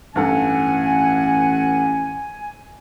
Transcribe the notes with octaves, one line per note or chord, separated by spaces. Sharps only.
A1 G2 A4 F#5 G#5